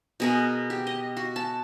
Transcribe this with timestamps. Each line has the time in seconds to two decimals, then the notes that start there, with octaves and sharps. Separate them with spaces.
0.20 B2 G#4 A#4
0.70 G4
0.87 D#5
1.17 F#4
1.36 A5